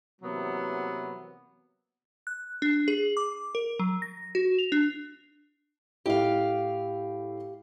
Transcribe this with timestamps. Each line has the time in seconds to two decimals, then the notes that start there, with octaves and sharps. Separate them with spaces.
0.21 C3 E3 F#3 A#3 B3
2.27 F#6
2.62 D4
2.88 G#4
3.17 D6
3.55 A#4
3.79 F#3
4.02 A#6
4.35 F#4
4.59 F7
4.72 D4
6.06 A2 E4 G4 D#5 F5